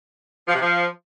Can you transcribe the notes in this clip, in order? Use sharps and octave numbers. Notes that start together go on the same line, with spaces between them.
F3
C3
F3